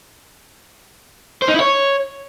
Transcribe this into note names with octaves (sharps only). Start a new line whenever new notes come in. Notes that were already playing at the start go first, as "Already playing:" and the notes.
C5
D#4
E4
C#5